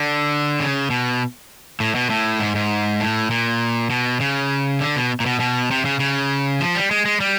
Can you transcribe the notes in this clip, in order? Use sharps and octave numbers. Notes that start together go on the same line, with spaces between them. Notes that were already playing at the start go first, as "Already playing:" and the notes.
Already playing: D3
C#3
B2
A2
B2
A2
G#2
G#2
A2
A#2
B2
C#3
D3
B2
A#2
B2
B2
C3
C#3
C#3
F3
G3
G#3
G#3
G3